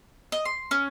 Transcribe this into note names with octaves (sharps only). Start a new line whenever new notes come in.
D#5
C6
C#4